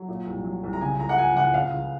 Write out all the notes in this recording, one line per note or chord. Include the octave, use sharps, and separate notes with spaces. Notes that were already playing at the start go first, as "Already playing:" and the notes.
Already playing: F#3
A#2
C2
F#3
C2
A#5
C#3 G#5
C#2 A#5
F#5
F3 G#5
C#2 F#5
C#3 F5
C#2